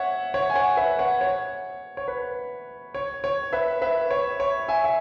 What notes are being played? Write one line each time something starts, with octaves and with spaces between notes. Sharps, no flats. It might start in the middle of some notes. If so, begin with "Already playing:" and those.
Already playing: C#5 E5 F#5
C#5 F#5
G#5
C#5 F#5
B4 E5
C#5 F#5
C#5
C#5
B4
C#5
C#5
B4 E5
B4 E5
C#5
C#5
E5 G#5
E5